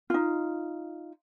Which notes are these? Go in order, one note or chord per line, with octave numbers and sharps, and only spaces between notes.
D#4 F4